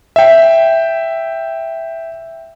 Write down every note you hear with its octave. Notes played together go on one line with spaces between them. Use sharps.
E5 G5